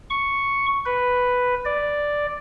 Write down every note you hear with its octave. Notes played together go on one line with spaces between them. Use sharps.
C#6
B4
D5